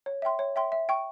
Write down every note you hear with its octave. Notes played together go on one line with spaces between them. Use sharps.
C#5
E5 G5 C6
C#5
E5 G5 C6
E5
G5 C#6